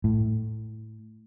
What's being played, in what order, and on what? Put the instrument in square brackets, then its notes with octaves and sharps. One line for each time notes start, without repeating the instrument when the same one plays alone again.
[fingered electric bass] A2